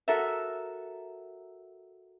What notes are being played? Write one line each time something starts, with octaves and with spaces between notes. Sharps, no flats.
F#4 A4 A#4 E5